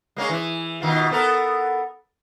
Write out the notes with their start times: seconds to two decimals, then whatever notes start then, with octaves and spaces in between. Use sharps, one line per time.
0.16 G#3 A#3 C#4
0.30 E3
0.82 B2 D#3 F4
1.11 B3 A4 A#4